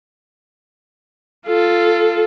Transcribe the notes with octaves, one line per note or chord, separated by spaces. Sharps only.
F4 A4